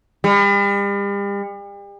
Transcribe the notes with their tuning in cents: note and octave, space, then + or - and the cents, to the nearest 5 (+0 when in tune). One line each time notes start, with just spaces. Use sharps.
G3 +40